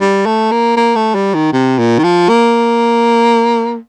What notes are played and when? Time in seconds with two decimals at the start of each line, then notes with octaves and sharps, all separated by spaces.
0.01 G3
0.26 A3
0.51 A#3
0.77 A#3
0.96 A3
1.15 G3
1.34 D#3
1.53 C3
1.79 A#2
1.98 D#3
2.04 F3
2.29 A#3